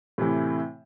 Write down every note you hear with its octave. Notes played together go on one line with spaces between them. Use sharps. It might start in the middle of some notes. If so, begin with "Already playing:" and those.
A2 C3 E3 E4